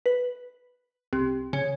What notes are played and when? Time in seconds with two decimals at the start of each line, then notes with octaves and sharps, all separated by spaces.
0.06 B4
1.13 C2
1.53 C#3